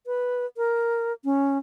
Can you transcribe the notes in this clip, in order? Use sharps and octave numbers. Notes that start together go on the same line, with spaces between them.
B4
A#4
C#4